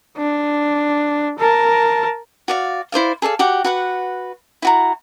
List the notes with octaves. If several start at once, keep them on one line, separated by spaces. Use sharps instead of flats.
D4
A#4 A5
F#4 D5 F5
E4 C5 D5 F5
G#4 A4 D5 F5
F#4 G4 F#5 D6
F#4 B4 F#5
E4 F#4 A#5